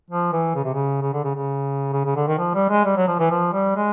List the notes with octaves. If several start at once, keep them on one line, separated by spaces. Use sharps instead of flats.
F3
E3
C#3
C3
C#3
C#3
D3
C#3
C#3
C#3
C#3
D3
D#3
F3
G3
G#3
G3
F#3
F3
E3
F3
G3
G#3